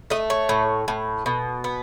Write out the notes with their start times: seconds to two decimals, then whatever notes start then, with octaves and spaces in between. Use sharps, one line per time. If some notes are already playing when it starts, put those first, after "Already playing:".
0.10 A3 D#5
0.30 C#5
0.49 A2
0.88 A2
1.26 B2
1.64 B3